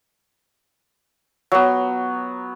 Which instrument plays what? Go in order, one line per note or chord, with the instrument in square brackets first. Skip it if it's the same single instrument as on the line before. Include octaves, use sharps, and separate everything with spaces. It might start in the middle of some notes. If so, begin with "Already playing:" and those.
[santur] F#3 B3